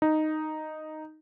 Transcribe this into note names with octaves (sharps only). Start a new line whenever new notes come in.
D#4